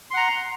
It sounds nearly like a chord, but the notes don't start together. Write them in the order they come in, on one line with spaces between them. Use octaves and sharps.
C6 F#5 A#5